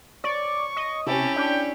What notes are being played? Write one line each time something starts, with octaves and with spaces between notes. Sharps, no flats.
C#5 D5 C#6
D#5
C3 C#4 E4 G4 G#5 A5
D4 G5